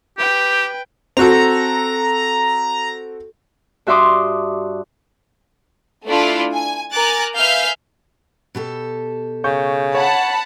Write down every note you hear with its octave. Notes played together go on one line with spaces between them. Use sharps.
G4 B4 G5
C4 F#4 A4 A#5
G2 F#4 E5 C6 D6 D#6
A3 D4 E4 F4
G#5
A#4 G#5 A#5 D6 F#6 A6
B4 E5 F5 G#5 F6 G6
B2 G4 A4
C#3 C#6 G6
C#5 F#5 A5 B5